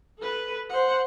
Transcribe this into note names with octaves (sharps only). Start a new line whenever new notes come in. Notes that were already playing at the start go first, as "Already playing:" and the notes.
A4 B4
C5 F#5